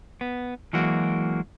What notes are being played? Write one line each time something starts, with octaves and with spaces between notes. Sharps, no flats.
B3
E3 F#3 G#3 A#3 F#4